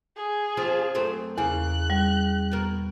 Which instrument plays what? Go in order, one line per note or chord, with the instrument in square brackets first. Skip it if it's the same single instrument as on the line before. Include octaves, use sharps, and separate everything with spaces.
[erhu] G#4
[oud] F3 C4 C#4
F#2 A3 C4
[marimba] E2 [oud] C#3 A#3 [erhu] F#6
[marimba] G3
[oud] B2 A#4